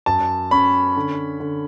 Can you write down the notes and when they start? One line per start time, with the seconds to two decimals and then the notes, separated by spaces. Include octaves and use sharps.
0.06 F#2 A5
0.51 C#4 B5
0.97 D3
1.40 D3